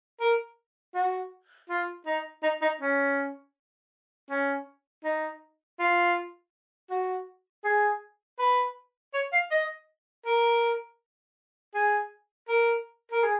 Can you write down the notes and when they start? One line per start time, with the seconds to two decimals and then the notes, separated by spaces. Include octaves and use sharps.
0.20 A#4
0.94 F#4
1.70 F4
2.06 D#4
2.43 D#4
2.62 D#4
2.81 C#4
4.30 C#4
5.04 D#4
5.79 F4
6.90 F#4
7.64 G#4
8.39 B4
9.14 C#5
9.33 F5
9.51 D#5
10.26 A#4
11.75 G#4
12.49 A#4
13.12 A#4
13.23 G#4